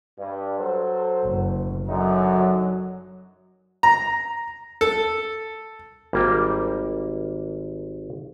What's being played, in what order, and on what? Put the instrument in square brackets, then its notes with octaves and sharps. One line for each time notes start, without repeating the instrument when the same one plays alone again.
[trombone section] G2
F#3 A4 C5
[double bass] F#1
[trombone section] F#2 D3 D#4 [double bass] F#3
[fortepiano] A#5
A4
[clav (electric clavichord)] G#1 G3 A#3 G5